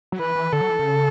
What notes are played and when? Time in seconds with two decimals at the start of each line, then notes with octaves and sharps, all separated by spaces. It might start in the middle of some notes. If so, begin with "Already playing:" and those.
0.12 F#3
0.18 E3 B4
0.35 E3
0.53 D3 A4
0.61 F#3
0.69 E3
0.79 C#3